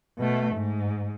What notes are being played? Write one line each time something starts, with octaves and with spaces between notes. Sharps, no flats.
B2 A3
G#2